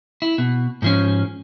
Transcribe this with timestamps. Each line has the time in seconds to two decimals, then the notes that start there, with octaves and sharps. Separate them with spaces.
0.22 E4
0.38 B2
0.82 G#2 F3 C#4